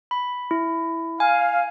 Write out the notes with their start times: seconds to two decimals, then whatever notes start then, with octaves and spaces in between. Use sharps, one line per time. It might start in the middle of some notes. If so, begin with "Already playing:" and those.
0.11 B5
0.51 E4
1.20 F5 G#5